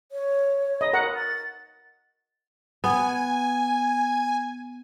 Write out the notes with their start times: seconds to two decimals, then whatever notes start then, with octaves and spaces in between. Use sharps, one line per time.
0.12 C#5
0.81 D#5
0.93 A#4 F#5
1.15 A6
2.84 B3 G#5